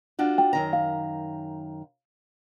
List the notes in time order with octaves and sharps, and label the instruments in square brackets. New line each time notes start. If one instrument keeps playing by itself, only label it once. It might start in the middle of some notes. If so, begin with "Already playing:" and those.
[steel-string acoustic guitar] D4 F4 F#4
[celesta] G5
[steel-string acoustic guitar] F#2 D#3 A#5
[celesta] F5